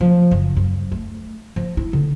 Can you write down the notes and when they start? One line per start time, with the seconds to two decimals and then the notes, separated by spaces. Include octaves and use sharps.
0.01 F3
0.31 F#1
0.56 F#2
0.92 A3
1.56 F3
1.77 E4
1.93 D3